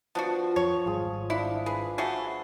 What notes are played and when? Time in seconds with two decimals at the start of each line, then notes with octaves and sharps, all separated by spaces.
0.15 F3 B3 D4 F#4
0.56 F2 C#5
0.86 G#1 G3 F4 G#4
1.30 D4 E4 F5
1.66 G#4 B4
1.98 A3 F#4 G#4